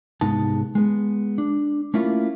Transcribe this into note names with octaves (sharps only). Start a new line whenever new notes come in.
C2 G#2 G#3 B3 D#4 A5
G#3 B3
D4
A3 A#3 C#4 E4 F4